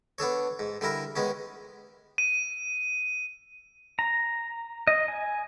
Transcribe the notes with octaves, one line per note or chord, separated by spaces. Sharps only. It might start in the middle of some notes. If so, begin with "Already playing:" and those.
B3 D4 A4 C#5
G#2
D3 G3 E4 A#4
D#3 G#3 B3 C#4
D#7
A#5
D#5
G#5